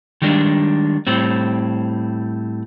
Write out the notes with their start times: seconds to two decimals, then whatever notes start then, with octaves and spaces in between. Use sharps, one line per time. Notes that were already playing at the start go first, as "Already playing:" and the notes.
0.22 D#3 G3 G#3 D4
1.07 A2 G3 C4